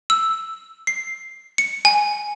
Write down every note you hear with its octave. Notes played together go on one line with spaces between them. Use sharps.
E6
C7
C#7
G#5